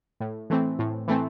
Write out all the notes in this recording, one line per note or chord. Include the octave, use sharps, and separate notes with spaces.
A2
E3 A3 C4
A2
E3 A3 C4